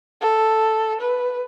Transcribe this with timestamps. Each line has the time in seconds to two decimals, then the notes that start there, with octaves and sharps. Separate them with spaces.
0.21 A4
1.00 B4